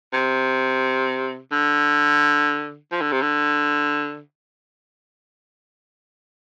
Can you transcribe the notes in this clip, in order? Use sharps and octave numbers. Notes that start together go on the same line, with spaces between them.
C3
D3
F3
D3
C3
D3